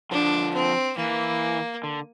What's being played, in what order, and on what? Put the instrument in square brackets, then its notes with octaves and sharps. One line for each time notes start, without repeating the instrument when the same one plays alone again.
[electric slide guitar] D3 F3 [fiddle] D4
[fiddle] C4
[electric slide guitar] E3 [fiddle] A#3
[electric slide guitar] D3